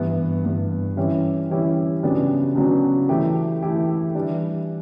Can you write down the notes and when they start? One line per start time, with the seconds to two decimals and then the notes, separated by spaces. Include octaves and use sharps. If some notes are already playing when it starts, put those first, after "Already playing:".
Already playing: G2 E3 B3
0.45 G2 E3 B3
0.97 E3 G3 C#4 E4 G4
1.50 E3 G3 C#4 E4 G4
2.03 C#3 F#3 B3 D4 G4
2.56 C#3 F#3 B3 D4 G4
3.09 E3 A3 E4 G4
3.63 E3 A3 E4 G4
4.15 E3 G3 D4